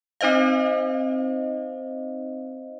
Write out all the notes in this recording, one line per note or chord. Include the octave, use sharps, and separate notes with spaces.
C4 D#4 C5 D#5 F5